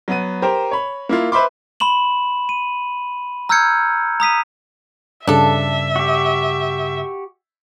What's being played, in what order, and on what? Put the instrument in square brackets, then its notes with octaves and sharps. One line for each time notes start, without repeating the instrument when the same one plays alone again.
[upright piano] F#3 B3 D#7
G4 A#4 C5
C#5 B5
A#3 E4 F4
B4 C5 E5 B5 C6 D6
[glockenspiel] B5 C6 E7 F#7
D#7
A#5 E6 F6 G6 G#6 C#7
A#5 D#6 B6 D#7
[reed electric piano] G2 C#3 [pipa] D4 A4 [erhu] E5
[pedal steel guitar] F#4 G4